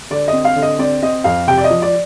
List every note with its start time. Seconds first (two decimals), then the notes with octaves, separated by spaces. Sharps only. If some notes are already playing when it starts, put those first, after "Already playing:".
0.10 D3 D5
0.28 D#5
0.33 C4
0.45 F5
0.56 D3
0.62 D#5
0.79 C4 D5
1.02 C4 D#5
1.24 F2 F5
1.48 C3 G5
1.58 D5
1.64 D#5
1.70 F3
1.82 D5